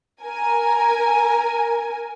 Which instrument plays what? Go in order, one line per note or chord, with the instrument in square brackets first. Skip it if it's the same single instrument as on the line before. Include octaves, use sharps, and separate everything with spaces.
[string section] A#4 G#5